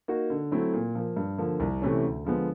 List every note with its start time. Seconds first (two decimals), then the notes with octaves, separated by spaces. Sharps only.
0.08 A#3 D#4 F#4
0.30 D3
0.52 F#3 A3 C4 E4
0.73 A#2
0.95 F3 A#3
1.17 G2
1.38 D3 F3 A#3
1.60 C2
1.82 C3 E3 A3 C#4
2.04 D2
2.25 D3 F3 G#3 B3